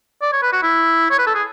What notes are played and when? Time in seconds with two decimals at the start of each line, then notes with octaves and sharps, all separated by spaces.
0.22 D5
0.32 C#5
0.42 B4
0.52 F#4
0.63 E4
1.10 C#5
1.19 B4
1.26 A4
1.35 G#4